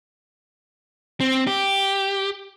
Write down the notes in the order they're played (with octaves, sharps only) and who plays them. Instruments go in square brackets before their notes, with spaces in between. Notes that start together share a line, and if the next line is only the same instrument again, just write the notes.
[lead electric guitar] C4
G4